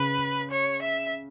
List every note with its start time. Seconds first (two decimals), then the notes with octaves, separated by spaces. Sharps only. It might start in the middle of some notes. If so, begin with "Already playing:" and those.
Already playing: C#3 B4
0.51 C#5
0.82 E5